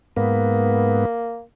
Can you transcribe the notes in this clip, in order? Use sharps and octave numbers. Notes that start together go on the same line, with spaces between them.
G#2 A#3 B3